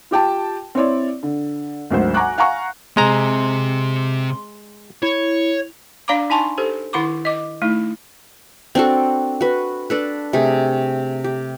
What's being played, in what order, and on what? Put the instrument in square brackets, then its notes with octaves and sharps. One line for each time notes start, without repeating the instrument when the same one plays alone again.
[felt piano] F4 G4 G5 A5
C4 E4 C#5 D5
D3
G#1 D2 F#3 C5
F#5 G#5 A#5 C#6 D6 F#6
F5 F#5 G#5 A#5 C#6
[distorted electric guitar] C3 C4 [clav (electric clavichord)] G#3 A#5 [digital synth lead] C6
[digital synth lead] E4 [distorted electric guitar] C#5
[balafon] D4 D5 F5 A#5 B5 D6
D#4 G#5 A5 C6 C#6
G4 A4 C5
D#3 E4 F#5 B5 C#6 D6
D#5 D6
A3 D#4 E4
[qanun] C4 D4 F#4 A4
F#4 B4
D4 A4 B4
C3 A3 G#4
G4